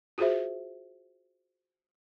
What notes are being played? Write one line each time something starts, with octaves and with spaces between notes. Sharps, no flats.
F4 F#4 G#4 C5 E5